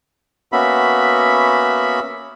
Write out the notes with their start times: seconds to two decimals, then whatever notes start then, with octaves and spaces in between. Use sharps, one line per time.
0.52 A#3 B3 C#4 F#4 E5 B5